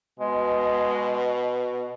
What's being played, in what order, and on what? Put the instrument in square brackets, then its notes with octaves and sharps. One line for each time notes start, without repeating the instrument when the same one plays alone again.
[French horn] B2 [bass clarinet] G#3